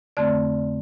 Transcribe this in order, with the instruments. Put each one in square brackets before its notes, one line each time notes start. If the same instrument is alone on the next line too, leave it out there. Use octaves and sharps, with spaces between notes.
[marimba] F2 D3 A3 C4 D5